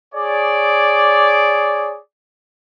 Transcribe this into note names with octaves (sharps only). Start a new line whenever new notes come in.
G#4 C#5 D5